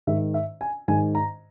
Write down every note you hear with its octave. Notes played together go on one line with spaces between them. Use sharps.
G#2 D#3 E5
E5
G#5
G#2 D#3 G#5
A#5